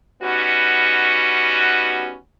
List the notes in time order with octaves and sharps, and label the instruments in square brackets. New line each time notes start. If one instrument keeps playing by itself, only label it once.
[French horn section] G3 B3 C#4 D#4 F#4